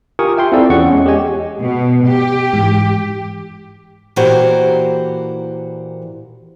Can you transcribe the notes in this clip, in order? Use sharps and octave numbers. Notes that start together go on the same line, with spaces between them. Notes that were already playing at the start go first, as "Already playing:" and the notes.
F4 G4 A#4 G#5 C#6 D#6
E5 G5 C6
C4 E4 F4 G#4 A4 D5
E2 C#4 F#5 C#6
G#3 C#4
G4 G#4 D#5 G#5
B2
G4
G#2 E3
A#2 E3 A#3 F#4 G4 C5